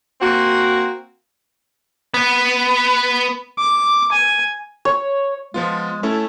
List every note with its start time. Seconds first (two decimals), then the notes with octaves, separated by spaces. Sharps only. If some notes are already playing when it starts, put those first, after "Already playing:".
0.20 A#3 C4 F#4
2.14 B3
3.58 D6
4.11 G#5
4.85 C#5
5.54 F3 G#3 B3 F4
6.03 A3 C#4 E4 A4